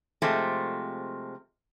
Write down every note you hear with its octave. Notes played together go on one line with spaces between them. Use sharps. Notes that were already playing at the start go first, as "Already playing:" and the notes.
C3 F3 G#3 A3 C4